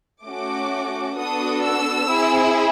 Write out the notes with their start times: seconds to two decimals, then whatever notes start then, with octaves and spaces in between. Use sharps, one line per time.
0.25 A3 C#4 F#4 D6
1.17 B3 D4 F#4 A4 D#6
1.62 E6
2.08 C4 E4 G#4